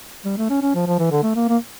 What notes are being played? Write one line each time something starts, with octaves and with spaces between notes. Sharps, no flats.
G3
A3
C#4
C#4
F3
F3
E3
D3
A3
A#3
A#3